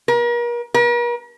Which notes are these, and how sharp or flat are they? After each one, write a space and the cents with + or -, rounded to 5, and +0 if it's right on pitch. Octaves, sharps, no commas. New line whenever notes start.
A#4 +40
A#4 +45